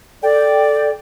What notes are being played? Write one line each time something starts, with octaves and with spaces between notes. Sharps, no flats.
A4 D5 G5